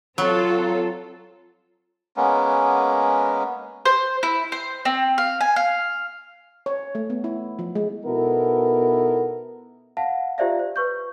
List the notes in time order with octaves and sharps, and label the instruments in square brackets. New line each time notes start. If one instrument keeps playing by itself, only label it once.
[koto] F#3 [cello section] C4 F4 A4
[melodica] G#3 A#3 B3 C#4
[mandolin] C5
E4
C5
C4
F5
G#5
F5
[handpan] C#5
A3
B3
E4
F3
G#3
[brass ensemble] B2 B3 D#4 E4 A4 A#4
[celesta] F5 F#5 A5
F4 G4 C5 D5 E5 F5
C5
B4 C#6 G6